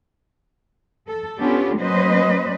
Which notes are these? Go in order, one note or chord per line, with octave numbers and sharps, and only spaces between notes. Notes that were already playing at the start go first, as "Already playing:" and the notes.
A4
B3 C#4 D4 F4 G4 A4
F#3 A#3 C#4 B4 C5 D#5